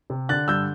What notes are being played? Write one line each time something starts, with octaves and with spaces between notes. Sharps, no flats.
C3
D3 F#6 A6
G2 E6 G6